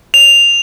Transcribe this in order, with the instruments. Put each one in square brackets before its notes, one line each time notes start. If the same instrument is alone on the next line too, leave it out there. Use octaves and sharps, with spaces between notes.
[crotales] F7